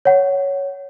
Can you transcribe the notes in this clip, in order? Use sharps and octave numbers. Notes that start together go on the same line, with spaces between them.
C#5 F#5